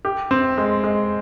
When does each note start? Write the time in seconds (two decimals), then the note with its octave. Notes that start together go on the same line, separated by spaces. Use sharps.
0.05 G4
0.31 C4
0.58 G#3
0.84 G#3